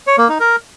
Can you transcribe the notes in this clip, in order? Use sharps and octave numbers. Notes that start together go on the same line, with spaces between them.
C#5
A#3
D#4
A#4